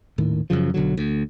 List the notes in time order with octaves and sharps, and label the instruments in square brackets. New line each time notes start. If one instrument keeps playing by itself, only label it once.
[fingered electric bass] D#1 A2 D#3
F#2 A#2 C#3 F3
B1 D3 F#3
D2